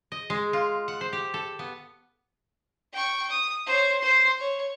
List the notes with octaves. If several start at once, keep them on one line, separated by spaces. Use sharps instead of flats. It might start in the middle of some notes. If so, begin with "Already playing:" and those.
D#5
G#3
F4
F#5
C5
G4
A4
B3
G5 C#6
D#6
C5 C#5
C5 C6
C#5